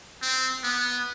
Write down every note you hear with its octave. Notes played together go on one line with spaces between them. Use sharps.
C4
B3